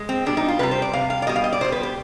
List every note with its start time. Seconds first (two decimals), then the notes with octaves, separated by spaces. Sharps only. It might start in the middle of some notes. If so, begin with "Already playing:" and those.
Already playing: G#3
0.09 C4
0.26 B2 G3 D4
0.37 D#4
0.48 F4
0.59 C3 G3 B4
0.71 C5
0.82 D5
0.93 C3 G3 F5
1.10 F5
1.22 D5
1.27 B2 G3 D#5
1.36 F5
1.44 D#5
1.53 D5
1.61 B2 G3 C5
1.72 B4
1.83 G4